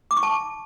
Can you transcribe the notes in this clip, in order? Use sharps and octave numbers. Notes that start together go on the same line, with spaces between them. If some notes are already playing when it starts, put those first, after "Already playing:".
D6
C#6
A5